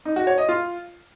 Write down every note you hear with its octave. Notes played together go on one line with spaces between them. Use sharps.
D#4
F#4
C#5
D#5
F4